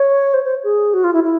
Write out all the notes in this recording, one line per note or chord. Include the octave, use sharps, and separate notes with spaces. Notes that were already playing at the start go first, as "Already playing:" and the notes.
Already playing: C#5
C5
C5
G#4
F#4
F4
E4
E4